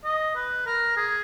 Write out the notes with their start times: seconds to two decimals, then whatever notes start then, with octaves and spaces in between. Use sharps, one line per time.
0.04 D#5
0.35 B4
0.66 A#4
0.97 G#4